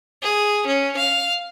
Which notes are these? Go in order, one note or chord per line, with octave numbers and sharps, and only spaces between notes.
G#4
C#4
F5